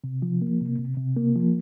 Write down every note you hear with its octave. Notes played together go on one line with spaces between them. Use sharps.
C3
F3
A#3
C3
C3
C3
A#3
F3